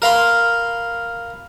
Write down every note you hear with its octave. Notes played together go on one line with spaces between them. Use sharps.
A#4 F5 B5 C6